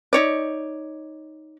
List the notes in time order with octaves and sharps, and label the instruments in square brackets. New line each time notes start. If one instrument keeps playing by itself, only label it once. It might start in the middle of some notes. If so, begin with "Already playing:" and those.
[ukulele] D#4 C#5 D5